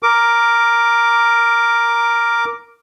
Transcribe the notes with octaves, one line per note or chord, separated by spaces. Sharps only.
A#4 D6